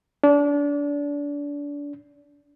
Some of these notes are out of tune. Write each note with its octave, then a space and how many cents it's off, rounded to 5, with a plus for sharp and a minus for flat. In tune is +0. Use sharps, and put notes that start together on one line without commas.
D4 -30